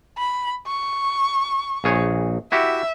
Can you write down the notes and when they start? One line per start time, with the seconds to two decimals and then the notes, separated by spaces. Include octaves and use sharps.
0.19 B5
0.67 C#6
1.84 A#1 G#4 C#5
2.52 E4 F#4 G4 E5